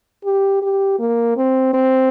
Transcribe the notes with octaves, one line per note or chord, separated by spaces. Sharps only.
G4
G4
A#3
C4
C4